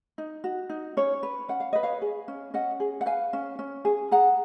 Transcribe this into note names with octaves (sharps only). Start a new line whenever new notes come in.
D#4
F#4
D#4
C#4 C#5
B4
C#4 F#5
F5
B4 D#5
C#5 F5
G#4
C#4
C#4 D#5 F#5
G#4
F#5
B4 F5 G#5
C#4
C#4
G#4
G#4 F#5 A#5